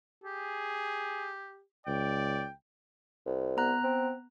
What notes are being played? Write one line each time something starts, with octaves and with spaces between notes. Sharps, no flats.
G4 G#4
C#2 D5 G5
C2
B3 A#5 F#6
C4